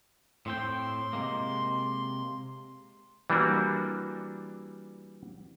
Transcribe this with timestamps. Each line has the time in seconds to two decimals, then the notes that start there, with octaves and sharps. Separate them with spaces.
0.46 A2 C4 G5 C6
1.13 C3 G#3 A#3
3.30 E3 G3 A#3 D4 F#4